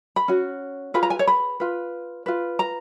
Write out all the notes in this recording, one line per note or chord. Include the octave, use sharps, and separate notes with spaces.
B5
C#4 F#4
F4 G#4 B4 B5
A#5
G#5
C#5
B5
F4 B4
F4 B4
A#5